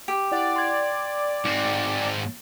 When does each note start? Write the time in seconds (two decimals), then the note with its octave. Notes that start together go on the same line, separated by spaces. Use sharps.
0.08 G4
0.32 E4 D5 F#5
0.56 D5 C6 G#6
1.45 G#2 C4